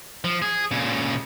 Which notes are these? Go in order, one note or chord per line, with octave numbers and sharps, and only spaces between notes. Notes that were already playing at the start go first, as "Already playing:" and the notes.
F3
G#4
A#2 C#3